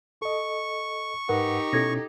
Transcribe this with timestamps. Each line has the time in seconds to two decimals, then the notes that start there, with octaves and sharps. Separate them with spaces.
0.22 A4 D#5 C#6
1.29 G#2 D#4 G4 A#4 B4 F#5
1.73 B2 C#4 E4 A4 G#6 A#6